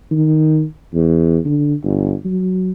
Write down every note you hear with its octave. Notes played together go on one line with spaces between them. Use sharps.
D#3
E2
D3
G1
F#3